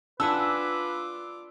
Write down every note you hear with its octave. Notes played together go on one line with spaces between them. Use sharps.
D4 F4 B4 F#5 G#5 D6 E6